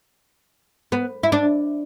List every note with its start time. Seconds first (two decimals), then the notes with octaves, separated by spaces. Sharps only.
0.92 B3
1.23 E4
1.32 D4